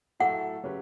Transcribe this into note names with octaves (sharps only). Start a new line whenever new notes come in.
A2 F#3 A3 E4 A4 F#5
C#3 F#3 C#4 G4 B4